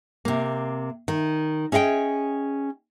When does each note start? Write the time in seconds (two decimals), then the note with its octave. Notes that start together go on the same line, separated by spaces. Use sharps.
0.25 C3 A#3
1.08 D#3
1.72 C#4 G#4 D#5 F5 G5